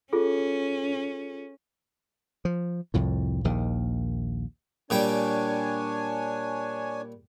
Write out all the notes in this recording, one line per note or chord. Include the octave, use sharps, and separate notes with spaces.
C#4 F4 G#4 A4
F3
C2 F2 A2
A#1 D#2 D#3
A#2 G3 D4 C#5 G5 G#5